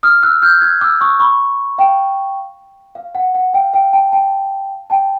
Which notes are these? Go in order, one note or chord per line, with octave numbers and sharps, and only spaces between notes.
D#6 F6
E6 F#6
F6 G6
F#6 G#6
D6 E6
C#6 D#6
B5 C#6
F5 G5
F5
F#5
F#5
F5 G5
F5 G5
G5 A5
G5 A5
G5 A5